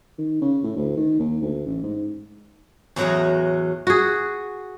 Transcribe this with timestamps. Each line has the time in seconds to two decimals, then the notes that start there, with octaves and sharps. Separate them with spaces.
0.18 D#3
0.41 C#3
0.64 A2
0.76 D2
0.97 D#3
1.19 D#2
1.41 D2
1.66 A1
1.83 G#2
2.96 E2 A2 F#3 F#4 D#5
3.87 F#4 G#4